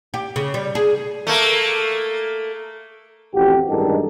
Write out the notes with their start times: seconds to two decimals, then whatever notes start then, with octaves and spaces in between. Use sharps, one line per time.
0.14 G4
0.36 C#3
0.54 G3
0.75 G#4
1.27 A3 A#3
3.35 A1 F2 F#4 G4
3.69 A1 G2 D#3 G#3 D#4 A4